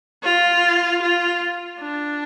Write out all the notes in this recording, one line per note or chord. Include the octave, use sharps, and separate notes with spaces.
F4
F4
D4